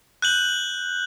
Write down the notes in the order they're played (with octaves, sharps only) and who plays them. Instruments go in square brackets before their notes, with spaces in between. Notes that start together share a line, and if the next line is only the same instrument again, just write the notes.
[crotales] F#6 G6 F#7